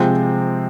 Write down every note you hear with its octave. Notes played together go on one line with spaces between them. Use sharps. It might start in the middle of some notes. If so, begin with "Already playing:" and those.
Already playing: C3 F3 G#3 C4